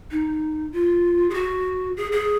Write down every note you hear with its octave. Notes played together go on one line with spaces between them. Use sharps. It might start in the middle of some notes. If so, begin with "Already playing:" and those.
D#4
F4
G#4
F#4
G#4
G#4